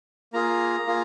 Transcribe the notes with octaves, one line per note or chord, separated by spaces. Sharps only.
A#3 F4 G#4 A#5
A#3 F4 G#4